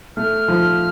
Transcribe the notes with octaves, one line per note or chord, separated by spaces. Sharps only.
A3 F6
F3